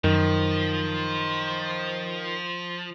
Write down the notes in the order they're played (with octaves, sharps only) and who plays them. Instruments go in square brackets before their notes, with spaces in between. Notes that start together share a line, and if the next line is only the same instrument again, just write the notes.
[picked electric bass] F#2 [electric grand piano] D#3 [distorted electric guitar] F3